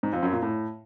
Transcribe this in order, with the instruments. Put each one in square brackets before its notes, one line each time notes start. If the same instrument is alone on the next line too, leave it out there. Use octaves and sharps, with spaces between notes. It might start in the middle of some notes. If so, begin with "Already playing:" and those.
[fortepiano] G#2
F2
F#2
A#2
A2